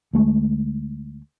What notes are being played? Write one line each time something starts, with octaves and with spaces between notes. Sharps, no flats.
D2 G#3 A3